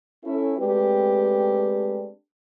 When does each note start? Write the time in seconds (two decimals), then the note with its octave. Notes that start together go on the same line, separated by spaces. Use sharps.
0.25 C#4 E4 A4
0.58 G#3 A3 C4 D4 G4 B4